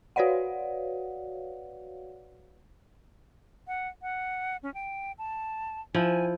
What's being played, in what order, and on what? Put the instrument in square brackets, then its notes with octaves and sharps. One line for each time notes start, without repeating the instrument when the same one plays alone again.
[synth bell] F#4 B4 C#5 D5 F5 F#5
[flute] F#5
F#5
C#4
G5
A5
[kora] F3 E4 [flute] G#5